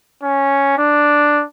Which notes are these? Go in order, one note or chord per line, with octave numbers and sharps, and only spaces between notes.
C#4
D4